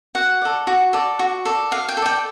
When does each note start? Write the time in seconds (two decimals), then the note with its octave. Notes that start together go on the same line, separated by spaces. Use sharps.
0.15 F#4 F#5
0.42 A4 D5
0.67 F#4
0.93 A4 D5
1.19 F#4
1.45 A4 D5
1.71 F#4 F5
1.88 G5
1.97 A4
2.02 D5 G5